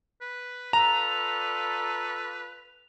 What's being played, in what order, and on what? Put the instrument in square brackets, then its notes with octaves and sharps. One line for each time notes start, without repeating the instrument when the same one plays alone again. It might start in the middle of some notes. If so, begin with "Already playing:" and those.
[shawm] B4
[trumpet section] F4 A4 D5 [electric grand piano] A#5 [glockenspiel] F7